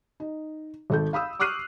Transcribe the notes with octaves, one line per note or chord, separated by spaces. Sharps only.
D#4
G#1 A4 G6
F5 B5 D#6 E6
C#6 D6 F6 F#6 C7 D#7